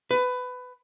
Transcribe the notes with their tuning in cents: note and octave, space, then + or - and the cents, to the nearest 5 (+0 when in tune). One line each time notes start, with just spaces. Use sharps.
B4 +20